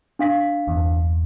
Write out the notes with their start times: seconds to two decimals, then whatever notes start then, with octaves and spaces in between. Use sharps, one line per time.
0.19 D4 F5 B6
0.67 G1 E2